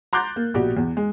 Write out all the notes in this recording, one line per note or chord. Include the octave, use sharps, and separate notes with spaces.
A#5 C6 D6 F#6 G6 A6
A#3
A#1 B2 F#4 G4 D5
E2
G#3